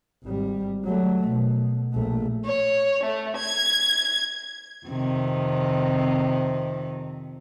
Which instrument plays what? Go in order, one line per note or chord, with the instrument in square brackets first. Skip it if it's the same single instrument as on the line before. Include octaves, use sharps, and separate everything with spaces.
[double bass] G#1 G3
F#3 A3
B2
A#1 A3
[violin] C#5
A3
G#6
[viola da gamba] F2 C3 D#3